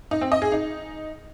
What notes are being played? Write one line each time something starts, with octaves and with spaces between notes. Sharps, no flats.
D#4
C4
D#5
G#4
D#4